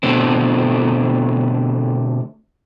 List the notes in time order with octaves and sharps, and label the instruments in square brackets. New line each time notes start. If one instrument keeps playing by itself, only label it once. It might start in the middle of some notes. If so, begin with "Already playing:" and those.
[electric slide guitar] B2 D3 A3 C4